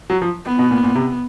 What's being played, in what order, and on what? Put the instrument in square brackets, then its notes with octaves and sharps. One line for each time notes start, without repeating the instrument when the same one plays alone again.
[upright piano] F#3
F3
[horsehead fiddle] B3
[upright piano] B2
A#2
A#2
C3